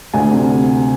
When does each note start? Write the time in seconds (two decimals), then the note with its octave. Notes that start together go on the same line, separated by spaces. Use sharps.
0.14 D2 G#5
0.32 C3